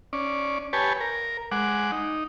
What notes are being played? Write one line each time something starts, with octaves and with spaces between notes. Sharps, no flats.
C#4 D5
G4 B4 C#5 G#5 A5
A#4
G#3 F#5 D6
D#4